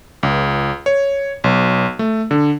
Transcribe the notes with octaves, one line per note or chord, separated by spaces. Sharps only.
C#2
C#5
B1
A3
D3